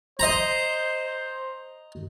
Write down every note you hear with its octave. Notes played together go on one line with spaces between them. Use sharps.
C5 D#5 A#5